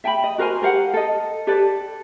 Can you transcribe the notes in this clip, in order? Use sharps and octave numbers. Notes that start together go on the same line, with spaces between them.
E5 G5 G#5 B5
D#5
F#4 A#4 C5 G#5
G4 A#4 F5 F#5
A4 D#5
G4 A4 B4 D5